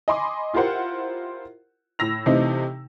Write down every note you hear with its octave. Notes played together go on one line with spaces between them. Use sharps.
D#5 G#5 B5 C6 D6
E4 F4 G4 A#4 C5 F#5
A2 E6 A#6 F7
C3 E3 A3 C4 D#4